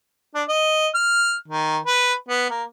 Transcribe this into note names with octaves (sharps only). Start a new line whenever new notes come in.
D4
D#5
F6
D#3
B4
B3
A#3